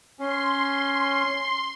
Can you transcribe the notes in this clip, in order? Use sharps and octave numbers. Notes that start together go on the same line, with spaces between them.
C#4 C6